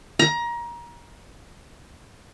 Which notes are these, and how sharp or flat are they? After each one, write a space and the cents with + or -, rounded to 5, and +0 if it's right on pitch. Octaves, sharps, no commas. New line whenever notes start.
A#5 +25